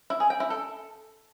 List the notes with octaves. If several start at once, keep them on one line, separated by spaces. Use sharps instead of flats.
E4
G#4
G5
E4
A4